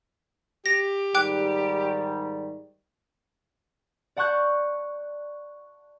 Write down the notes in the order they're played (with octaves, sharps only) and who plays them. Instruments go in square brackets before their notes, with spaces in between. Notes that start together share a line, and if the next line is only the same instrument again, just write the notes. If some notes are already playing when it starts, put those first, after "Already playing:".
[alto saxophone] G4 [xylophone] A#6
[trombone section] G#2 D#3 G3 [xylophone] G5 D6 F#6
[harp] D5 F#5 A5 C#6 F#6 G6